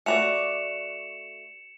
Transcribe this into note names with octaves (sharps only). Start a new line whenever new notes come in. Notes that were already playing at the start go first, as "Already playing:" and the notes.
A3 F#4 D5 C#7 E7 F7